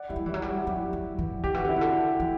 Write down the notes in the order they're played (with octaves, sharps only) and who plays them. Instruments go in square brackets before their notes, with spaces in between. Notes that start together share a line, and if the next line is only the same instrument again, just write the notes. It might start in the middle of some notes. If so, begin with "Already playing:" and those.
Already playing: [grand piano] D5 F#5
[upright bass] F#3 [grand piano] E4 G4
[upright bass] G3
[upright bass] E3 [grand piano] E4
[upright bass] F#3
G3
[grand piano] F#4
[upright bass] F#3 [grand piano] E4 G4
[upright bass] F#3
E3
[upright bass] D3 [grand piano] G4
[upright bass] E3 [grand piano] F#4
[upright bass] D3 [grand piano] E4
[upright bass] C3
[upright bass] D3 [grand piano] F#4
[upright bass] E3